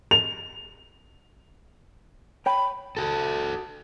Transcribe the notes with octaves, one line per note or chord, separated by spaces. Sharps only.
F7
C#5 G5 B5
F#4 A4